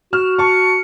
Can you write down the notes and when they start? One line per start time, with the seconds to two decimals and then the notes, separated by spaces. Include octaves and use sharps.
0.13 F#4 F6 E7
0.38 A5 C#6 C#7